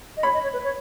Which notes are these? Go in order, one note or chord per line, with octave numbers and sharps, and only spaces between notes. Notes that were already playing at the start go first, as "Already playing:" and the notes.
D#5
C#5 B5
D#5
C#5
B4
C#5